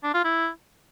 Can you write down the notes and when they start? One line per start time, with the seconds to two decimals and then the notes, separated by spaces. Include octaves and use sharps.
0.04 D4
0.14 F4
0.25 E4